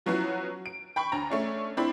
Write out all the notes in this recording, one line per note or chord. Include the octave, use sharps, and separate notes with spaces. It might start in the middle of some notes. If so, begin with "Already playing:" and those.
F3 F#3 B3 C#4 E4 F#4
D7
G5 B5 C#6
D2 A#5
A3 C#4 D4
C4 D4 E4 B5